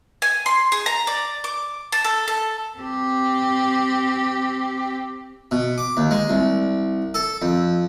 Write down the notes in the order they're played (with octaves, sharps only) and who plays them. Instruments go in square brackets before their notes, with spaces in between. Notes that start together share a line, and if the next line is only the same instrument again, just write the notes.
[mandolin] G#5
C6
G#4
A#5
D5
D6
A5
A4
A4
[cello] C4 G4
[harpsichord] B2
D6
D#2
G#3
C2
A4
F2